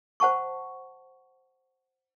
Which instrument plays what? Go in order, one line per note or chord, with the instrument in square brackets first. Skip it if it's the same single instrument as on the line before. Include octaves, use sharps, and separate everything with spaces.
[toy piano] C5 F#5 A5 C#6